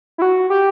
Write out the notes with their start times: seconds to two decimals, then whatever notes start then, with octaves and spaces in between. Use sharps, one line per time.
0.18 E4
0.22 F#4
0.50 G4